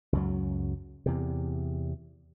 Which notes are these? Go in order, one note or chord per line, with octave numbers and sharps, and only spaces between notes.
C#2 F#2 F#3
E2 C3